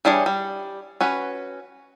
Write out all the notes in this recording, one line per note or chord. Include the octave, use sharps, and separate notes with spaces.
E3 G3 D4 G#4 C#5
G3
C#4 F#4 B4